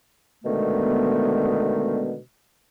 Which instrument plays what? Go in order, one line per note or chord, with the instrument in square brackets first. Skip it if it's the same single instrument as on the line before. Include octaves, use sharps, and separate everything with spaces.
[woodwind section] B2 D3 D#3 G#3 A3 B3